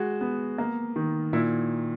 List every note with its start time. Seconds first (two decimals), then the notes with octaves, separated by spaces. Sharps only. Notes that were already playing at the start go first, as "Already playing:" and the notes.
Already playing: G#3 F#4
0.21 B3
0.58 A#3
0.96 D#3
1.33 A#2 E4